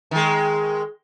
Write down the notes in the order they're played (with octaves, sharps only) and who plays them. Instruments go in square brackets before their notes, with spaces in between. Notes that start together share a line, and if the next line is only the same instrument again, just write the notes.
[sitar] D#3 G#3